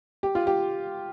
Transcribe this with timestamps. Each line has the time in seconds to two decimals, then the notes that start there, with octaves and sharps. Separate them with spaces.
0.23 G4
0.35 F4
0.47 G4